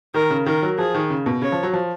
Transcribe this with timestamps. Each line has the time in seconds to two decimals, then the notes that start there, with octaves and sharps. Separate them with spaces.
0.14 D#3 A#4
0.31 C#3
0.46 D#3 A#4
0.63 F#3
0.78 F3 G#4
0.95 D#3
1.10 C#3
1.26 B2
1.42 C#3 C#5
1.52 F3
1.63 F#3
1.73 F3